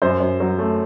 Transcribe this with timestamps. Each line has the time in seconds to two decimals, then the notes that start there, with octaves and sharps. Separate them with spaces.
0.02 F#2 C5
0.20 F#2
0.40 F#3
0.58 A3